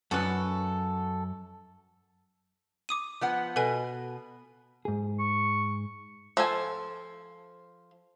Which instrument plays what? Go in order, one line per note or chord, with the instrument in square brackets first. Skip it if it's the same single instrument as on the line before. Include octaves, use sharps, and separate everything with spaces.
[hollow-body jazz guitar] F#2 B4 [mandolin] F#4 A4
[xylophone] D6 D#6 D#7
[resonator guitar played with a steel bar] F3 B3 F#5
[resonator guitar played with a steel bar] B2 [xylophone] A4 B4 G#5
[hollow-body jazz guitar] G#2 G#4
[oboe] C#6
[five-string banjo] F3 A4 G#5